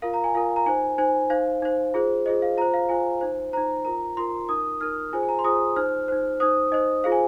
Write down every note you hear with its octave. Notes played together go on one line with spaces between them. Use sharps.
F4 A#4 F5
A#5
G#5
F4 A#4 F5
A#5
D#4 C5 G#5
D#4 C5 G#5
D#4 C5 F5
D#4 C5
F4 G#4 C5
F4 G#4 C5 D#5
F5
F4 C5 A#5
F5
F4 C5 G#5
D#4 C5
D#4 C5 A#5
F4 A#4 A#5
F4 A#4 C6
D#4 A#4 D#6
D#4 A#4 F6
F4 G#4 C5 G#5
G#5
A#5
C6
F4 G#4 C5 D#6
D#4 C5 F6
D#4 C5
D#4 C5 D#6
D#4 C5 D#5
F4 G#4 C5 F5
G#5